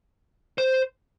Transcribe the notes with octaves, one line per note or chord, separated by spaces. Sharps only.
C5